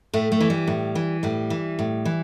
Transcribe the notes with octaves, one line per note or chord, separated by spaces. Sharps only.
A2 A3
A3
E3
G3
A2
E3
A2 G3
E3
A2
E3